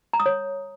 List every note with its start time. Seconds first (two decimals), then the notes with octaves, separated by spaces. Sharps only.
0.13 A#5
0.20 D#6
0.26 C#5